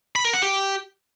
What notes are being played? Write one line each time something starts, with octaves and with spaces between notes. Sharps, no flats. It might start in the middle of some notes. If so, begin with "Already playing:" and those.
B5
A#4
F#5
G4